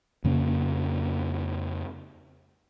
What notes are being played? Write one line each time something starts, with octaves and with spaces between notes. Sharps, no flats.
F2 C#3 A#3 C#4